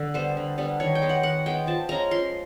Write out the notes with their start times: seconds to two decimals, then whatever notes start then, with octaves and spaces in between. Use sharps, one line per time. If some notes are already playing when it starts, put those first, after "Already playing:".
Already playing: D3
0.14 G3 B3 D4 C5
0.37 D3
0.58 G3 B3 D4
0.80 D#3 C#5
0.95 G5
1.02 G#3 B3
1.09 F#5
1.23 D#3 F#5
1.46 G#3 B3 G5
1.67 F3 A5
1.89 G#3 C#4 A#5
2.11 F3 C6